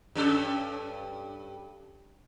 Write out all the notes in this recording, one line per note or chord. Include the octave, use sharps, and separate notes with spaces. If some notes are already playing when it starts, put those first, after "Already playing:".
G2 C#4 A4